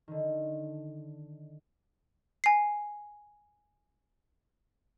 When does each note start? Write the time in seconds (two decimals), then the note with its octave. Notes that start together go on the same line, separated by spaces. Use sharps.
0.08 D3 D#3
2.44 G#5 C7